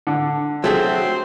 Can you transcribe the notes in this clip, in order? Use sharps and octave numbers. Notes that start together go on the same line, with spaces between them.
D3
F#3 A3 C4 G#4